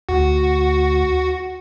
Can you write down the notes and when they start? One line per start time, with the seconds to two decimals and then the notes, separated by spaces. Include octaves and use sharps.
0.09 D2 F#4